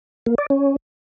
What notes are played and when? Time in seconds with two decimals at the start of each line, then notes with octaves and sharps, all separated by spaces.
0.26 A#3
0.38 D5
0.50 C#4